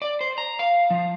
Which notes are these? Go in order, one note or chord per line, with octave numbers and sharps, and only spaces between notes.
D5
C5
A#5
F5
F3